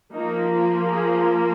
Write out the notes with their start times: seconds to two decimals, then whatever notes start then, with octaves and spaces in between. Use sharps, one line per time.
0.14 F3 A#3 D#4
0.51 F4
0.89 G#4